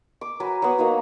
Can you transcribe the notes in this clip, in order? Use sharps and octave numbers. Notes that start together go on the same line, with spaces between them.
D6
F#3 A#4 B4 G#5
F#3 B3 D#6
A#3 D#4 F#4